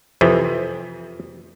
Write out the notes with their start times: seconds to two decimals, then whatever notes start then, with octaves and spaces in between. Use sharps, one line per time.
0.21 F2 C3 E3